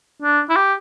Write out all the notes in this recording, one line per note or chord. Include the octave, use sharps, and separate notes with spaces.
D4
E4
G4